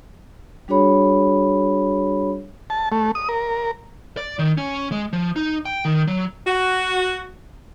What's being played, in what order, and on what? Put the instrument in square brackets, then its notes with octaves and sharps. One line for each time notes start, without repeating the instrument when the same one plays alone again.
[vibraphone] G3 D4 F#4 G#4 C#5 B5
[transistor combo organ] A5
A3
D#6
A#4
[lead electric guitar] D5
D#3
C#4
G#3
F3
D#4
G5
D#3
F#3
[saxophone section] F#4